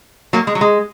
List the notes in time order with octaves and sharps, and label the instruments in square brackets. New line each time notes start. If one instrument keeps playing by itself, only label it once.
[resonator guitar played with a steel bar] F#3 A#3
G#3
F#3
G#3